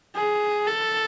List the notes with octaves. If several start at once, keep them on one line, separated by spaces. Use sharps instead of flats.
G#4
A4